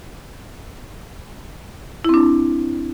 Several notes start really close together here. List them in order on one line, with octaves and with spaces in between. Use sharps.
E4 C4 D4